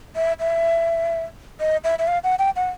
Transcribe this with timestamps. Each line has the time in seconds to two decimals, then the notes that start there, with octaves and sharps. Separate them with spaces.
0.16 E5
0.40 E5
1.60 D#5
1.84 E5
1.99 E5
2.08 F5
2.24 F#5
2.39 G5
2.56 F#5